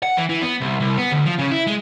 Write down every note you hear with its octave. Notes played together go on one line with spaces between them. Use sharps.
F#5
E3
E3
B3
C2
C2
B3
D2
F3
C#3
E4
G#3